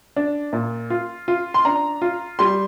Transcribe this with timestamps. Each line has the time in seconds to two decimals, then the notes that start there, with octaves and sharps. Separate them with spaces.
0.16 D4
0.53 A#2
0.90 F4
1.28 F4
1.54 C6
1.65 D4 A#5
2.02 F4
2.39 G3 C6